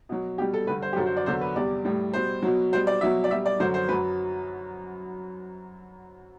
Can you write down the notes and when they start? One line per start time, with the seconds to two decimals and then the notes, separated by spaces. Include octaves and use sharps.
0.09 B2 F#3
0.38 B2 G4
0.42 G3
0.54 A4
0.67 G2 D3 G3 B4
0.82 C5
0.93 G4
0.97 F#2 D3 F#3 A4
1.06 C5
1.17 D5
1.26 E2 D3 F#3 C5
1.41 B4
1.56 E2 C3 G3 D5
1.85 A2 G3
2.14 B2 G3 C5
2.43 B2 F#3
2.72 B2 G3 C5
2.87 D5
3.01 B2 F#3 E5
3.24 D5
3.30 B2 G3 E5
3.46 D5
3.60 F#2 D3 F#3 C5
3.74 C5
3.89 F#2 F#3 B4